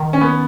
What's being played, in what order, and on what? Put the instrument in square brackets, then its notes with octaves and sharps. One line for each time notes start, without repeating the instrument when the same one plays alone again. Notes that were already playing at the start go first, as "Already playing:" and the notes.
Already playing: [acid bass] D#3
[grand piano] C#4
B3